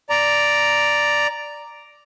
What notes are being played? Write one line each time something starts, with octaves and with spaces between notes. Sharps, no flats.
D5 A#5